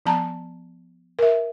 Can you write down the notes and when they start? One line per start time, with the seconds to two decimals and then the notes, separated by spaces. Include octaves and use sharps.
0.06 F3 B3 A5 A#5
1.19 A#4 E5